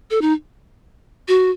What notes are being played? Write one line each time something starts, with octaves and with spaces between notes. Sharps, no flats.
A4
D#4
F#4